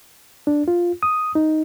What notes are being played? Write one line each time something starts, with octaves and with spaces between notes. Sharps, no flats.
D4
F4
D#6
D#4